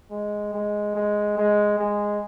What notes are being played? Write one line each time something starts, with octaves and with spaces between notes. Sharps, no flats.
G#3
G#3
G#3
G#3
G#3